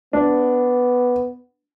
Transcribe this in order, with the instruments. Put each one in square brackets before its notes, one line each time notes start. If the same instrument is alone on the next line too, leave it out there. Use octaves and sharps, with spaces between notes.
[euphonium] B3 [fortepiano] D4